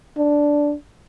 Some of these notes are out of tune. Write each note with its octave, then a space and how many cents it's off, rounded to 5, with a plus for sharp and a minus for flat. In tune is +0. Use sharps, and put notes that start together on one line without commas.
D4 -5